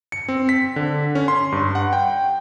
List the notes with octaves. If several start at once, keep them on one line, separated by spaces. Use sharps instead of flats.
C#7
C4
B6
D3
C#4
C6
G2
F#5
G5